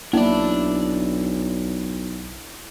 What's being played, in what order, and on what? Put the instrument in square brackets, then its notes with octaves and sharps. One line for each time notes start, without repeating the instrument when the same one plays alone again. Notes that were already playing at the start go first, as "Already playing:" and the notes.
[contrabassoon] B1 [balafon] A#3 [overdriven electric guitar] D4 D5 [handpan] E4